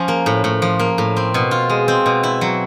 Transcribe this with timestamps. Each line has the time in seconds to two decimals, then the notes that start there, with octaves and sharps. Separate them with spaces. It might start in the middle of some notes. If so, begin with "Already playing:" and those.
Already playing: F3 C#4 F4
0.08 A#3
0.26 A2
0.44 A2
0.62 F3
0.79 A#3
0.98 A2
1.16 C4
1.34 B2
1.51 F4
1.69 G#3
1.88 C4
2.06 B2
2.23 E4
2.41 F#3